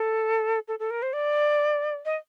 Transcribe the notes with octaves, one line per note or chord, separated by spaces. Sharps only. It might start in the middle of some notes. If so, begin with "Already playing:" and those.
Already playing: A4
A4
A4
A#4
C5
D5
D#5